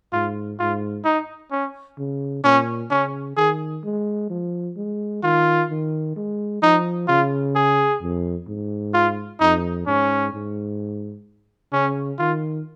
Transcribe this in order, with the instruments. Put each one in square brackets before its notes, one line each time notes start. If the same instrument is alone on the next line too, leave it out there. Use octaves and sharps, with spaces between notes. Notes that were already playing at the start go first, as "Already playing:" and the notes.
[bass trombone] G#2 [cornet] F4
[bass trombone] G#2 [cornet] F4
[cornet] D#4
C#4
[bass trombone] C#3
[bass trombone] A#2 [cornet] C#4
[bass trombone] C#3 [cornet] C#4
[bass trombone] D#3 [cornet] G#4
[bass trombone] G#3
F3
G#3
[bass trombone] D#3 [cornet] F4
[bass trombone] D#3
G#3
[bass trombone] F3 [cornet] D#4
[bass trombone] C#3 [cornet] F4
[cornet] G#4
[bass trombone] F2
G#2
[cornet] F4
[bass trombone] F2 [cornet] D#4
[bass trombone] G#2 [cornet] C#4
[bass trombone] G#2
[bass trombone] C#3 [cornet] C#4
[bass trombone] D#3 [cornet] F4